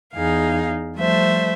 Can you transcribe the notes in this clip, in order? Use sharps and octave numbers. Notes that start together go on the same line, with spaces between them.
E2 D#4 G#4 F5
F3 G3 A3 C5 E5